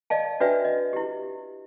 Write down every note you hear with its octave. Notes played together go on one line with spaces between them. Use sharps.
D5 D#5 F5 A5
D4 F#4 B4 D5 E5 G5
D#5
E4 G4